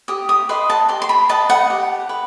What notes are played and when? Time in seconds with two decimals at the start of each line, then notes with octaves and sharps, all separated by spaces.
0.08 G4 D#6
0.29 D#6
0.49 B4 D#5 C6
0.70 A5
0.88 G4 C6
1.02 C6
1.09 B5
1.29 B4 D#5 A5
1.50 F#5
1.70 G4
2.09 B4